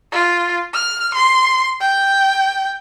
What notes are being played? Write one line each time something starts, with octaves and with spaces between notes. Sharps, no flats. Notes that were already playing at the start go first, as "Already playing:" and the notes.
F4
F6
C6
G5